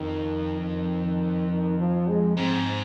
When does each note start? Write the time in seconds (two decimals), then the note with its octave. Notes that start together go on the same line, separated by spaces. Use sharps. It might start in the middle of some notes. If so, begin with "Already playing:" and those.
Already playing: F2 D#3
0.60 D#3
1.04 D#3
1.49 D#3
1.78 F3
2.08 G#3
2.37 G#2 C4